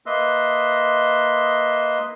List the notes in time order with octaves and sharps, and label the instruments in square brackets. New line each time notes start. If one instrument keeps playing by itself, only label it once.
[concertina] A#3 B4 D#5 E5 C6 E6